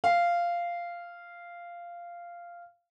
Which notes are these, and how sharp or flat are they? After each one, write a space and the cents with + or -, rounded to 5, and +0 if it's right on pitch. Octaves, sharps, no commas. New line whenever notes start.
F5 -10